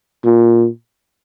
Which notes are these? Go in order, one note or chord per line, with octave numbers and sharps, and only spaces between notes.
A#2